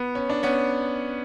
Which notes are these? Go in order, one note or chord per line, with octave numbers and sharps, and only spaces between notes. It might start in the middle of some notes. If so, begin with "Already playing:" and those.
Already playing: B3
C#4
D4
B3 C#4